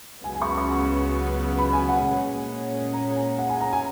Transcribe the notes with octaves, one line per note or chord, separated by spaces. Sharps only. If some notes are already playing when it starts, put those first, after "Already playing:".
C#2 C#3 F#3 B3 G#5
G#5
C#6
B5
C#6
B5
G#5
F#5
A#2 G#3 C#4 G#4
A#5
G#5
F#5
G#5
A#5
G#5